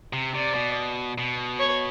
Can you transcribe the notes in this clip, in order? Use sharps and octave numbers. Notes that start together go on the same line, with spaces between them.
C3
C3 D5
B2
B2
C#5